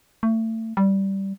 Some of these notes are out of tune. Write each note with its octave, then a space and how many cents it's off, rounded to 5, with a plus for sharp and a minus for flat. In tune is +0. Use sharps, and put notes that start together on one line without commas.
A3 +30
G3 -10